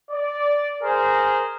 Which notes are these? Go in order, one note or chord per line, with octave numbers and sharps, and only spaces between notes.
D5
G#4 A#4 C5